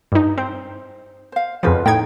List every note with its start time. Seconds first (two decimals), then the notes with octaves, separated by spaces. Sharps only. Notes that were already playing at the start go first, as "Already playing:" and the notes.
0.12 G2 D#4
0.38 C4 C5
1.32 C5 F5
1.63 F2 C#3 F3 F4 F#4 B4
1.86 A2 D#4 G5 G#6